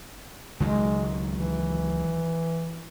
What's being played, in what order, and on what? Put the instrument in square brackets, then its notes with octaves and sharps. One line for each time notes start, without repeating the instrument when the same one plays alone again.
[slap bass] C#2 D#3 F#3 [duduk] G#3
[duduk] E3